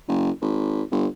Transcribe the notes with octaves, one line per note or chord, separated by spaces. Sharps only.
F#1
G#1
G1